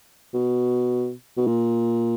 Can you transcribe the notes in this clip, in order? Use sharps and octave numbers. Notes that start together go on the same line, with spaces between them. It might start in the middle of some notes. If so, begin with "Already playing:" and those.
B2
B2
A#2